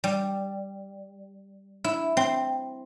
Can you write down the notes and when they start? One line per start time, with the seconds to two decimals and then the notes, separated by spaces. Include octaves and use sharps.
0.04 G3
1.84 E4
2.17 C4